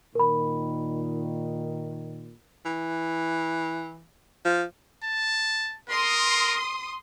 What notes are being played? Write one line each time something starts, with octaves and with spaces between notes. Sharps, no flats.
A#2 D#3 A#4 B5
E3
F3
A5
A#4 C6 D#6